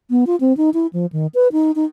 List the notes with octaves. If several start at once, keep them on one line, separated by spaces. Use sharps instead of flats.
B3
F4
C4
D#4
E4
F3
D#3
B4
D#4
D#4